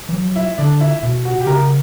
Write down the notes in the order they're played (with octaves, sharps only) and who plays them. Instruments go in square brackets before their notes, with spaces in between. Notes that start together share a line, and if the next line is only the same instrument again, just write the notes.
[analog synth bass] E3
F#3
[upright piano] E4
[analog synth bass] D3 [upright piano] D4
[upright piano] E4
[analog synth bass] B2
[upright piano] F#4
G4
[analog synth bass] C#3 [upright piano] A#4